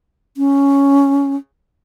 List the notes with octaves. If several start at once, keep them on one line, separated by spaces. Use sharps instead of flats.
C#4